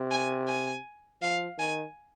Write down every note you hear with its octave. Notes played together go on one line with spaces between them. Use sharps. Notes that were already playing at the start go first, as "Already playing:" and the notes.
Already playing: C3
G#5
G#5
F3 F5
D#3 G#5